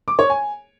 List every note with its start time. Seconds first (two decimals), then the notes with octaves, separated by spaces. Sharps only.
0.08 D6
0.19 C#5
0.30 G#5